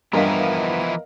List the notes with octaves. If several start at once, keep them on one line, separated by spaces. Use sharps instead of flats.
G2 E3 F3 B3 E4 A#4 D#5 F5